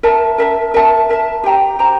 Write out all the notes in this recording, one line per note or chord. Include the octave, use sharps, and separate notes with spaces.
A#4 E5 A5
A#4 E5 A5
A#4 E5 A5
A#4 E5 A5
G4 C5 G5 A#5
G4 C5 G5 A#5